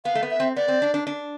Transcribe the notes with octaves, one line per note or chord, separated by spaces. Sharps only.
B3 F5
A3
B3
E5
C4
B3 D5
C4
D4
D4
D4